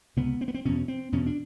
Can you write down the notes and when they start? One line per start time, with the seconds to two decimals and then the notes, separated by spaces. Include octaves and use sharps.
0.17 C#2 C3 B3
0.41 C4
0.48 B3
0.54 C4
0.65 E2 B2 C#4
0.88 C4
1.12 E2 B2 C#4
1.26 D4